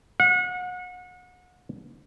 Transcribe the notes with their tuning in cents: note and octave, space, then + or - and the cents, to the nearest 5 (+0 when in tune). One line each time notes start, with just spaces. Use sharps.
F#5 -35